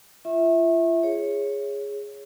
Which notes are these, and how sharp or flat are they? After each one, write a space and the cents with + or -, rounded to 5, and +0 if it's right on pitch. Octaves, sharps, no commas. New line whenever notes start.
F4 -40 E5 -15 C#6 -35
G#4 -10 C#5 +0